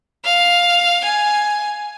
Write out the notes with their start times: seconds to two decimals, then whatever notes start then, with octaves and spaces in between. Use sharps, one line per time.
0.24 F5
1.04 G#5